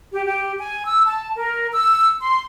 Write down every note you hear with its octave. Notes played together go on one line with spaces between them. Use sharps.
G4
G4
G#5
E6
A5
A#4
E6
C6